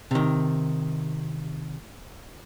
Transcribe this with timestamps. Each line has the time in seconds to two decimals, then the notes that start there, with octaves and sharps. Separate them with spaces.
0.11 C3 D#3